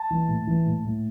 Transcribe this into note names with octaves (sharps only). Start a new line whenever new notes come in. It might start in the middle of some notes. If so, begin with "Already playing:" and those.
Already playing: A5
E3
A2
E3
A2
A2